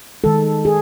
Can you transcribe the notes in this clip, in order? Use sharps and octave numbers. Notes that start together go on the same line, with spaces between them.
D#3 G#3 A4
G#4